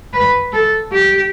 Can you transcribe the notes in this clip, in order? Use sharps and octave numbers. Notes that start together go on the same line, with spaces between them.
B4
A4
G4